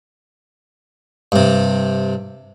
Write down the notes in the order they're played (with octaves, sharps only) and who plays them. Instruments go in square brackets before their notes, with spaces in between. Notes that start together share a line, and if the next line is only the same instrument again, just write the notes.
[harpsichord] G2 C3